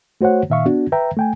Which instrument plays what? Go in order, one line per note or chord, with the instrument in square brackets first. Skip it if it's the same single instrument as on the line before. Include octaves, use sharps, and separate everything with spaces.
[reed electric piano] A3 F#4 C5 C#5 F#5
A#2 D#3 E5 F5 C#6
B3 D4 F#4
B4 E5 G5 A#5
A3 G5 G#5